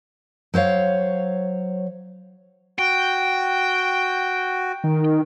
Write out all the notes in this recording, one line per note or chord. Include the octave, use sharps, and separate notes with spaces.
F#3 C5 C#5 F5
F#4 G5
D#3